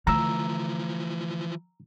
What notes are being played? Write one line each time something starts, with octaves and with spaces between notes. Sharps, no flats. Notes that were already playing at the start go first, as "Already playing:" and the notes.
D3 E3 F3 A3 A#5 E6